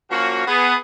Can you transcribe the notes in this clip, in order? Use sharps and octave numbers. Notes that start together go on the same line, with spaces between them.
F3 A#3 C#4 F#4
B3 G#4